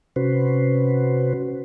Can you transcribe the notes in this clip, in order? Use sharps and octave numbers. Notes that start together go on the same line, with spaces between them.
C3 C#4 F#4 B4 C5